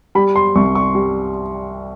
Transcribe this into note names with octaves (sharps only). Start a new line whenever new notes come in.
G3 B5
C6
C2 C#6
C#6
G3